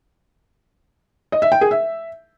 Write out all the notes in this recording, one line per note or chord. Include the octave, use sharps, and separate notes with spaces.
D#5
E5
G5
G#4
E5